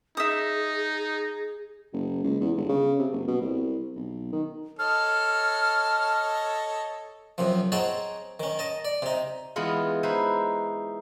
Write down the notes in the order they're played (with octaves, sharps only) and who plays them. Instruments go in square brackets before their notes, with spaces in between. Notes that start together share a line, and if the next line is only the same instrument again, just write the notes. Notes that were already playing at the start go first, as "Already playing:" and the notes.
[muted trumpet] D#4 [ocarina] G#4 [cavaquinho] E5 D#6
[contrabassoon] F#1
C#2
E2
G1
C#3
C3
F#1
B2
C2
B1
D#3
[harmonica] A4 C#5 D#5 [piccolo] F6
[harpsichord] F#2 C3 F3
C4 D#4 G#4 C#5 F#5 A5
D#3 C#4
D#5 A5
D5
C3 D#4
[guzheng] E3 G#3 B3 F4 G#4
D#4 E4 B4 C5